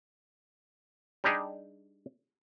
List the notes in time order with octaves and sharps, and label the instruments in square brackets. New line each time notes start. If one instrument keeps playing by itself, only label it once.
[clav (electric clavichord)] G3 D4 D#4 G4 G#4